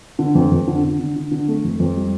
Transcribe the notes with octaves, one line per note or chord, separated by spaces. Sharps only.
D3
F2
F2
D3
D3
D3
D3
D3
A3
F2
F2
G3